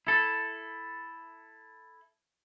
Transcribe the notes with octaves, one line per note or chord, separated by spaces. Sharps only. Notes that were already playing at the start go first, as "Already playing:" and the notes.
E4 A4